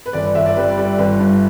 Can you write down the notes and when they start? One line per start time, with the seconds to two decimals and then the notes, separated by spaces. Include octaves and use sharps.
0.06 B4
0.13 G1 D5
0.35 G1 E5
0.46 D5
0.56 G3 B4
0.70 D5
0.78 G3
0.84 D5
0.98 G1 B4
1.19 G2